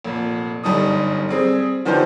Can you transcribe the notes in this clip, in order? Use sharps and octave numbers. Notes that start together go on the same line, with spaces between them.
F1 A#2
G1 F#2 G3 D#4 D#6
G3 C4 G#4
D3 D#3 F3 B3 G4 C5